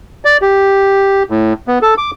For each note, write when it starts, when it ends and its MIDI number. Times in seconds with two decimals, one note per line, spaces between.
0.25 0.37 74
0.42 1.23 67
1.30 1.53 45
1.68 1.79 59
1.82 1.94 69
1.98 2.11 86